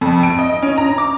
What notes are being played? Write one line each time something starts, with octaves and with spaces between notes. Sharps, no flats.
F2
D7
D#5
C#4
A#5
D6